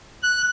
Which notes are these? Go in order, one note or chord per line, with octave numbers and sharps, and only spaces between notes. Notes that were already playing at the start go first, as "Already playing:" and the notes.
F#6